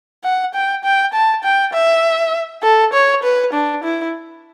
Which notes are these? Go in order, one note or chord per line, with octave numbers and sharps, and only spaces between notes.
F#5
G5
G5
A5
G5
E5
A4
C#5
B4
D4
E4